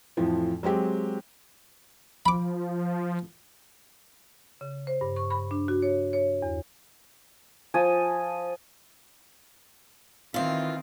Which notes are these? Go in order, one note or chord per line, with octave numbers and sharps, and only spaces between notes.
F2 A2 E3 F3
F#3 G#3 C4 G4
F3 B5 D6
C#3
C5
G2
C#6
B5
D4
F#4
C#5
C#5
E2
F3 G#5 D#6
D#3 E3 C4 F4